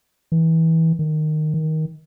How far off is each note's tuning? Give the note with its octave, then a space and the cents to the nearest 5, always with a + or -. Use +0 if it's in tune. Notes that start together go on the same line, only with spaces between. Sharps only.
E3 -25
D#3 -15
D#3 +15